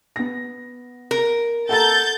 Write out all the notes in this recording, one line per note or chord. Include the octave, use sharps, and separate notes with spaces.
B3 A#6
A#4
A4 F#5 A5 A#5 G6 A6